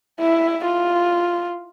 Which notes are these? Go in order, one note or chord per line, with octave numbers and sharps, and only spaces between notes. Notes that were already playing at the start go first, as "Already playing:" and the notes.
E4
F4